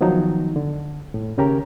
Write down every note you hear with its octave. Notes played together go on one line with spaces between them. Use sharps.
D#3 F3 F#3 B3 D#4
D3
A2
D#2 C#3 C#4 G4 A#4 A#5